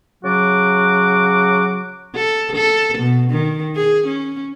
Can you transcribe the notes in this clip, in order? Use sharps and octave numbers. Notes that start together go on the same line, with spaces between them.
C#3 F#3 F#4 D6
A4
A4
B2
D#3
G#4
C#4